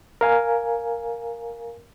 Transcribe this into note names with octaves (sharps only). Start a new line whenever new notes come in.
A#4 F5 G#5